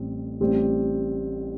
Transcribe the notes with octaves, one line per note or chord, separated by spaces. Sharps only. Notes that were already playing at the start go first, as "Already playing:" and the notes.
Already playing: A1 A2 G3 C4 G4
A1 A2 G3 C4 G4